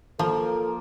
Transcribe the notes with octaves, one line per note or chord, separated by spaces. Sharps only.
F3 A#3 F4 A4 A#4